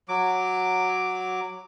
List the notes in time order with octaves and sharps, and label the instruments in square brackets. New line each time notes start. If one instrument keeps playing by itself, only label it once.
[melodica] F#3 D6